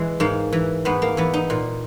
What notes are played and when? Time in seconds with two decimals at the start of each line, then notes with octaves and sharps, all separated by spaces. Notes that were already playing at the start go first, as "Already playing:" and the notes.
Already playing: E3 G#3
0.20 G#2 A#3
0.53 E3
0.85 G#2 B3
1.02 A#3
1.17 E3 B3
1.34 D#4
1.50 A#2